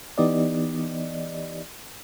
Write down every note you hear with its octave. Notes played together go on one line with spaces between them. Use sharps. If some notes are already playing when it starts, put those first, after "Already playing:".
E3 B3 D#4 G4 D5 D#5